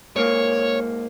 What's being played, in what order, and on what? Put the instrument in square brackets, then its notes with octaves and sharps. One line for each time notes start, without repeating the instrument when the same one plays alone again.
[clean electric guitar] G#2 A#3 [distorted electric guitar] C#5